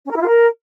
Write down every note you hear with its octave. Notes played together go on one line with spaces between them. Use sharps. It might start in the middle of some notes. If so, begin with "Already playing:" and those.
C#4
A#4
E4
F4
A#4